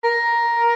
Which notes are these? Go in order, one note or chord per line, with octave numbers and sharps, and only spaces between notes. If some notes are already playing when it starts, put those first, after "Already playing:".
A#4